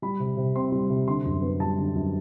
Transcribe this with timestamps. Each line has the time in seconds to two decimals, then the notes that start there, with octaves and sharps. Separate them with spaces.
0.02 G3 B5
0.20 C3
0.37 C3
0.55 C4 C6
0.72 G3
0.90 C3
1.07 D3 C6
1.26 F#2
1.42 B3
1.60 G3 A5
1.78 D3
1.95 F#2